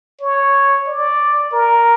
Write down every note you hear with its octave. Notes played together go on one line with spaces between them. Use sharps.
C#5
D5
A#4